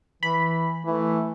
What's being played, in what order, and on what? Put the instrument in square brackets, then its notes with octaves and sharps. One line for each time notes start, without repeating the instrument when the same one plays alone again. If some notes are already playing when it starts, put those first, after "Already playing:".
[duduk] E3 [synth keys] B5
[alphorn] E3 [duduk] A3